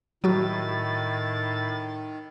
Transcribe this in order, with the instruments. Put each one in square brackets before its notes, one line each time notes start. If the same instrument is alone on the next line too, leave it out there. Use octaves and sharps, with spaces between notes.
[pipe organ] A2 A6 [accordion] D#3 [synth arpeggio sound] F#3 F#4 E6